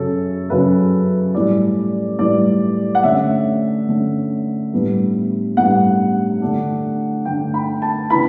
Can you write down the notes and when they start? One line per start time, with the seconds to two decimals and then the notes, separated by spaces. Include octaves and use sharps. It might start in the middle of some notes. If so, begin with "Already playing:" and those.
Already playing: F#2 C#3 F#3 C#4 A4
0.50 F#2 C#3 F#3 C#4 B4
1.34 A2 E3 G3 D5
2.19 A2 E3 G3 D5
2.95 F#5
3.03 D3 A3 C#4 E5
3.88 D3 A3 C#4
4.72 A2 G3 B3 D4
5.57 A2 G3 B3 D4 F#5
6.42 D3 A3 D4
7.25 D3 A3 D4 G5
7.54 B5
7.82 A5
8.10 C#3 E3 B3 D4 B5